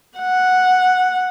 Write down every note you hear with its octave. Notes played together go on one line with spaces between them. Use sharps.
F#5